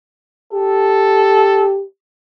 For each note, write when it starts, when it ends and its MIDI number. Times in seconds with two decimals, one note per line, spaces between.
0.53 1.84 67
0.53 1.75 69